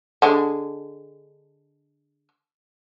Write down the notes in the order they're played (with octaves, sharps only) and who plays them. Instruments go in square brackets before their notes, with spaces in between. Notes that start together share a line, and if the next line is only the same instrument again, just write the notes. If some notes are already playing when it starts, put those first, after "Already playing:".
[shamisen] D3 G#3